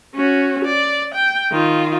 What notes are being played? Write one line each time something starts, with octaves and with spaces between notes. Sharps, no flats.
C#4 F#4
D5
G5
D#3 F4